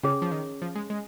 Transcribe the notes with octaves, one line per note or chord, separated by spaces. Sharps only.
C#3 C#4 G#4 C#5
F3
D#3
F3
G#3
G#3